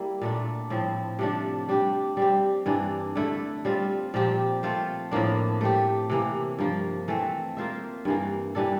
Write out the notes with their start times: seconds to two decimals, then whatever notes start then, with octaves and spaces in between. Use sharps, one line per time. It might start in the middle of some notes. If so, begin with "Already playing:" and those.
Already playing: G3 A#3 E4
0.21 A#2 A3 D4
0.70 A2 F3 C4
1.19 C3 F3 A3 D4
1.69 G3 D4 G4
2.17 G3 C4 G4
2.66 G2 E3 A#3 D4
3.16 D3 A3 E4
3.65 G3 C4 F4
4.14 A#2 F3 C4 G4
4.63 A3 C4 F4 C5
5.11 A2 F3 A#3 D4
5.61 A3 C4 G4
6.10 C3 E3 A#3
6.59 G2 F3 A#3
7.08 E3 A3 C4
7.57 A#3 F4 C5 E5
8.05 G2 E3 A#3
8.55 E3 G3 D4 A4